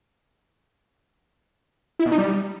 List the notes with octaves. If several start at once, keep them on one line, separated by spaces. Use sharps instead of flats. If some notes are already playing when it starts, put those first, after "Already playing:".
E4
B2
D#4
G3